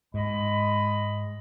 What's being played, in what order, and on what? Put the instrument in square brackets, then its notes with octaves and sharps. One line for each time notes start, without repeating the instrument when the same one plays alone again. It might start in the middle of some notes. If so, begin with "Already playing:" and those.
[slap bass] G#2 [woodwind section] G#3 D#5 B5